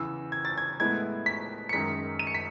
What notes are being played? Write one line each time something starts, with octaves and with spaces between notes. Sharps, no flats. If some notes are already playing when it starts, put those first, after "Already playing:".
Already playing: E2 C#3 E3 E6
G#6
A6
G#6
A2 G#3 B3 E4 G#6
B6
C#7
F#2 D#3 G#3 D#4 B6
D#7
C#7
B6